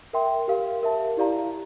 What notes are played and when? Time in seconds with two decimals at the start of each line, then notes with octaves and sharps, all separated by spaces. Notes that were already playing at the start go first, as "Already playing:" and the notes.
0.13 A#4 E5 G5 C6
0.48 G4 A#4 F5
0.83 A#4 E5 A5
1.17 E4 G4 D5 F5 A#5